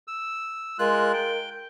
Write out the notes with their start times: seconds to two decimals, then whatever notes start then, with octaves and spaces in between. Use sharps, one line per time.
0.08 E6
0.79 G#3 F4 A#4 F#6
1.14 G5